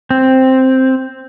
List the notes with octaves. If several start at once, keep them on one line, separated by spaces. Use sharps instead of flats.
C4